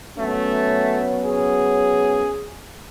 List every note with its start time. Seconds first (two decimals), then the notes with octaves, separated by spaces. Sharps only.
0.18 F#3 A3 B3 C#4
1.24 G#4